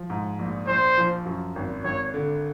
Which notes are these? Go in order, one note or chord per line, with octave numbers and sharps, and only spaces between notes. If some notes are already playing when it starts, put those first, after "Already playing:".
Already playing: F3
G#2
A#1
A#1 C5
F3
F#2
G#1
G#1 C#5
D3